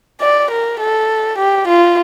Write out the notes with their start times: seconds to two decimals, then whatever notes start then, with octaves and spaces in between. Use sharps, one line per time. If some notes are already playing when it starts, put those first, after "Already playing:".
0.21 D5
0.51 A#4
0.80 A4
1.38 G4
1.68 F4